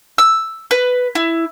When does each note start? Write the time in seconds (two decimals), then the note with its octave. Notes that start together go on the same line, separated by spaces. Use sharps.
0.18 E6
0.71 B4
1.15 E4